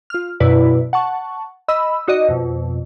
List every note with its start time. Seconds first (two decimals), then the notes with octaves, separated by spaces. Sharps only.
0.10 F4 F6
0.40 F#2 B2 E4 B4 D5
0.93 F#5 A5 C#6
1.68 D#5 B5 E6
2.08 D#4 F#4 D5 D#5
2.28 F2 B2